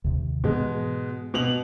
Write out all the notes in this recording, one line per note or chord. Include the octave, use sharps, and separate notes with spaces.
D#2 C3
G#2 B2 E3 G#3
B2 F7 F#7